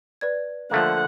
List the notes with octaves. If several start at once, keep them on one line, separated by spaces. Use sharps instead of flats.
B4 D5 G#6
D3 F3 A3 A#3 F#5